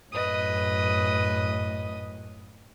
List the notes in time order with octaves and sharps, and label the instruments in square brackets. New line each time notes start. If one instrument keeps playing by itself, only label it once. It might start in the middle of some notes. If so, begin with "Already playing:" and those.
[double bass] F#2 A2 [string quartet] B4 D#5 D#6